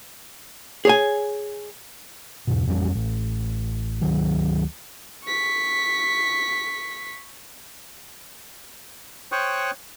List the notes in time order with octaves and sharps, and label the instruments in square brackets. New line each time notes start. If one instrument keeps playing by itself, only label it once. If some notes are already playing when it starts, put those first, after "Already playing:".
[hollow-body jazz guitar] G#4 C#5 G#5
[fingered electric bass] E2 G#2 B2
A1 F2 G3 C#4
A1
D2 D#3 F#3
[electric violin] C#6 B6
[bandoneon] C5 C#5 G5 C#6 D#6 F#6